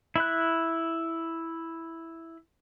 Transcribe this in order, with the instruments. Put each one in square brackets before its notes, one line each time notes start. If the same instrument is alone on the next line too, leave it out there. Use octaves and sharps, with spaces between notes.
[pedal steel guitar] E4 B5 F#6